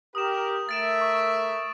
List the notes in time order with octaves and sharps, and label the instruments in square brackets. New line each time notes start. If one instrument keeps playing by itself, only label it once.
[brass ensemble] G4 A#4 [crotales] D#6 E7
[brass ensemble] A3 A#4 E5 [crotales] A6 D7 E7
[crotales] C#6